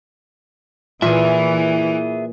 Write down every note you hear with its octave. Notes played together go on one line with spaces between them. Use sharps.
A#2 E3 G#4 E5